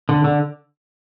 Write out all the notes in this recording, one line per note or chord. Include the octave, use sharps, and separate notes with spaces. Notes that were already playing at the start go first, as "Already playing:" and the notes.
D3
D3